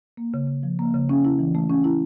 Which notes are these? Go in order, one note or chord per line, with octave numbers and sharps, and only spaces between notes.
A#3
C#3
C#3
F3
A#3
C#3
C#4
E4
E3
A3
C#4
E4